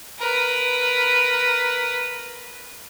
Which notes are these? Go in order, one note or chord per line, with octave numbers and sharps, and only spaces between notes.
A#4 B4